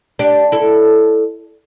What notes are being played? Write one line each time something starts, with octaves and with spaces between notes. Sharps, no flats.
D4 G4
E4 A4